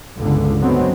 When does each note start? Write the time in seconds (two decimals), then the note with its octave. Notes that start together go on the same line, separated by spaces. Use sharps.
0.18 G1 C#2 D3
0.60 D3 F#3 G#3 B3 C4